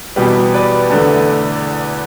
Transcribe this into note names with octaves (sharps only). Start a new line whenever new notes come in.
E2 B2 G3 G4 B4
B4 D5
E2 D3 A3